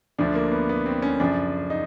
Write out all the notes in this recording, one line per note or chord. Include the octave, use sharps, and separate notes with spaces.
D2 D3 F3 D4
A#3
B3
B3
C4
C#4
F#2 C#3 F3 D4
D#4